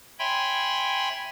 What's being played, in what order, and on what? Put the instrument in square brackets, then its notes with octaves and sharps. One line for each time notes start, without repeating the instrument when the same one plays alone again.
[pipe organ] C#5 E5 G5 G#5 B5 C6